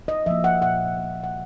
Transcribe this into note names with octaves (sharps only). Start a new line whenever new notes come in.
D#5
F3 A#3 E5
F#5
A#2 F#5
F3 A#3
F#5